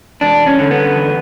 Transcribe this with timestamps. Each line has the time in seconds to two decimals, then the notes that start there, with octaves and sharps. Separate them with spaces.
0.21 E2 D4
0.46 C#4
0.59 D3
0.71 B3
0.95 E2